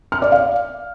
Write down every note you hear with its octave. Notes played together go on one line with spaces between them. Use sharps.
F6
D5
F5